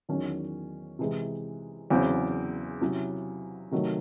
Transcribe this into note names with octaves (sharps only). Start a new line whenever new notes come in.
E2 D#3 F#3 C#4
C3 E3 G#3
E2 C#3 F#3 C4 E4
C3 F#3 C#4 E4
C3 D#3 F#3 A3